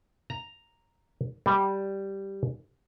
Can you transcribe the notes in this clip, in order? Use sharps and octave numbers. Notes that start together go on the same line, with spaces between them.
A#5
G3